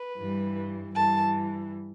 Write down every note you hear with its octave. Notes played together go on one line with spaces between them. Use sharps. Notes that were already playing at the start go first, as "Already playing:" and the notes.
Already playing: B4
G2 E3 G3
G2 E3 G3 A5